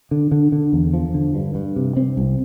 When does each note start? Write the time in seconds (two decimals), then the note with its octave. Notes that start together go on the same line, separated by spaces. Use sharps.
0.11 D3
0.32 D3
0.52 D3
0.73 E2
0.94 F3
1.14 D3
1.35 G2
1.55 G2
1.76 C3
1.97 C4
2.17 C2